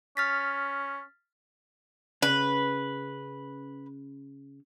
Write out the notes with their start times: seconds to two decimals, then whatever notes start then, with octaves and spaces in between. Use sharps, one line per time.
0.17 C#4 F6 A6 B6
2.22 C#3 B4